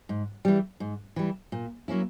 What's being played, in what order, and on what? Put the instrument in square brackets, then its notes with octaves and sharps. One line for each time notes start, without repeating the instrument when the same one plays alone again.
[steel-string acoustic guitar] G#2
E3 G3
G#2
E3 G3
A#2
F#3 A#3 C#4 E4